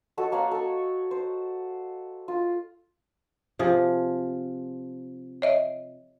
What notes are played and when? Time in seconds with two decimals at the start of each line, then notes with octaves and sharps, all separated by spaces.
0.17 F#4 A4 C#5 D#5
0.32 A#3 C#5 F#5 C6
0.51 A4 C#6
1.11 C5
2.28 F4
3.59 C3 F3 G#4
5.42 C#5 D#5 E5